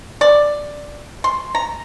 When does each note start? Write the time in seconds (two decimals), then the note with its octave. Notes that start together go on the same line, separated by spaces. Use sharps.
0.21 D5
1.24 C6
1.55 A#5